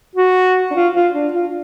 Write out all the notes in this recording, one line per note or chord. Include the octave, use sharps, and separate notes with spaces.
F#4
D4
F4
F4
D4
F4